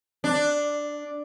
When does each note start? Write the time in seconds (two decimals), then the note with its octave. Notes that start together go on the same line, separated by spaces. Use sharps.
0.24 D4